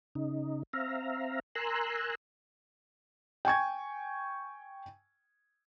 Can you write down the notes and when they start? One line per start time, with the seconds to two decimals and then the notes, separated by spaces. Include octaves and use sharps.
0.15 C#3 D#4
0.73 C4 E5 F5 A#5
1.55 A#4 G#5 A#5 C6 E6 F#6
3.45 G5 G#5 C#6 G#6